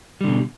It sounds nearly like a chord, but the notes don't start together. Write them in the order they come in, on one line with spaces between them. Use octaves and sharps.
G3 D3 B2